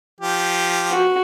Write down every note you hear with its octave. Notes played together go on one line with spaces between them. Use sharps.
F3 G4
F#4